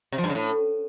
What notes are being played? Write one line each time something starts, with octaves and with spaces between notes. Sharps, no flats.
C3
F3
G2
C#3
A2